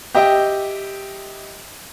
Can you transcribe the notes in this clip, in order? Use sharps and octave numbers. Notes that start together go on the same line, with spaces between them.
G4 D#5 E5 G5